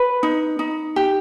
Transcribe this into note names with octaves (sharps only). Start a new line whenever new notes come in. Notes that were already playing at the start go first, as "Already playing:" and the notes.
Already playing: B4
D#4
D#4
G4